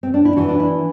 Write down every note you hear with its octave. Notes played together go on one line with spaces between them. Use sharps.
C4
D4
E4
E3 F#4
D4
E4